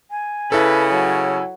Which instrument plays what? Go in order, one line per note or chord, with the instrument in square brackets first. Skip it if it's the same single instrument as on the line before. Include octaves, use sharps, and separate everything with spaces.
[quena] G#5
[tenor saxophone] C#3 [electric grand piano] E4 A4 [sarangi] B4
[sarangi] F#3